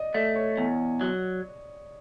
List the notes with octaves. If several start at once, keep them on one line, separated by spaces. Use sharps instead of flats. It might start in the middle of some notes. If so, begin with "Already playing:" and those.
Already playing: D5 D#5
A3 D5
C#5
E2
F#3